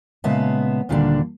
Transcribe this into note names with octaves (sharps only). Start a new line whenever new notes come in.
A#2 C#3 G#3 B3 E5 A5
D2 A#2 D3 D#3 G3 D4